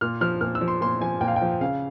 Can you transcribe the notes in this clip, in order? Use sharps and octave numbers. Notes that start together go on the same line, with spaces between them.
A#2 F6
F3 F6
A#2 F6
E6
F3
C6
A#2 C6
F3 G#5
A#2 G5
F5
G5
F3
C#3 F5